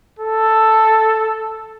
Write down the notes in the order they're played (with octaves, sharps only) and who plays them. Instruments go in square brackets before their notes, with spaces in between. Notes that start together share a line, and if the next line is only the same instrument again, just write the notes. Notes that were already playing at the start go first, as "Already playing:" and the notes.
[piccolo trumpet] A4